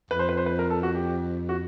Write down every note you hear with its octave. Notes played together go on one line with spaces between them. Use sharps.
F2 B4
C5
B4
C5
B4
A#4
A4
F#4
G4
F#4